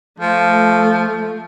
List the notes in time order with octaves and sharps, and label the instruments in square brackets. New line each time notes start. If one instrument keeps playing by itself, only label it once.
[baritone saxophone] F3 [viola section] A3